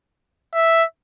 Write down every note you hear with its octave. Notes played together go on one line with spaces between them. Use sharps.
E5